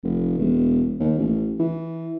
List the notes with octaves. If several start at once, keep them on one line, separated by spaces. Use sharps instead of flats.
F1
E1
D#2
A1
E3